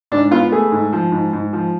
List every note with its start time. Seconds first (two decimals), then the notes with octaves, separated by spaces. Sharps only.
0.12 G#2 D4
0.31 B3 F4
0.52 A3 G#4
0.72 G#2
0.93 F3
1.12 G#2
1.33 G#2
1.53 F3